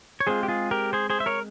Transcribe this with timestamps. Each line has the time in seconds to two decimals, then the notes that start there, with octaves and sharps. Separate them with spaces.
0.20 C#5
0.27 G#3 C4 F4 G#4 C5
0.43 G4
0.48 F4 G#4
0.71 G4 A#4
0.93 G#4 C5
1.10 G#4 C5
1.20 E5
1.26 A#4 C#5